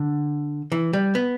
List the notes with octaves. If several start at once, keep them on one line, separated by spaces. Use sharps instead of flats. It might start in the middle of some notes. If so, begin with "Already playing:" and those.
Already playing: D3
E3
G3
B3